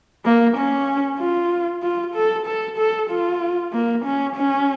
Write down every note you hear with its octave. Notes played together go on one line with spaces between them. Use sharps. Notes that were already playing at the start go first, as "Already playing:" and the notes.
A#3
C#4
F4
F4
A4
A4
A4
F4
A#3
C#4
C#4